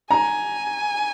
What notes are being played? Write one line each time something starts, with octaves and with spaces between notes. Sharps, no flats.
G#5 A#5